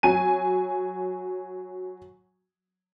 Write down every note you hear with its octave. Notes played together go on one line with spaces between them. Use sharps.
F#3 G#5 D#7